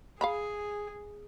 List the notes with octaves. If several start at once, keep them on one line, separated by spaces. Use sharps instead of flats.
G#4 F5 A#5 B5